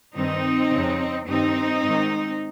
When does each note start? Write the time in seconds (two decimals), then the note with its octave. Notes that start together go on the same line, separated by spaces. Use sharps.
0.15 G2 D#3 C4 D#4
0.71 F2 C#3
1.27 G2 D#3 C4 D#4
1.83 G#2 D#3